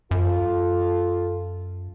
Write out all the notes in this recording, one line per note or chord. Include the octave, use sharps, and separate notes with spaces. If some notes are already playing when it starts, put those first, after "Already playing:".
F#2 F4 A4